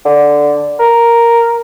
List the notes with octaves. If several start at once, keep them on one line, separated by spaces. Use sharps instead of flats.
D3
A#4